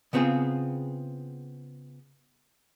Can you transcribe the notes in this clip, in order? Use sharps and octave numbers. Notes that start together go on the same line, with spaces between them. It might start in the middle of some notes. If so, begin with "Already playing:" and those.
C#3 B3 C4 F4 G#4